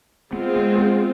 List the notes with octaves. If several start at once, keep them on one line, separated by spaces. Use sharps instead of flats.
G#3 B3 C4 F4
B3
B3